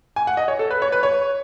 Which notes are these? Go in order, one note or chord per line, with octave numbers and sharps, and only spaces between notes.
G#5
F#5
D#5
C#5
A4
B4
C#5
B4
C#5